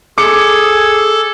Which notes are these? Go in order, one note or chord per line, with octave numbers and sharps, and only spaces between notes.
G#4 A4 D6 C#7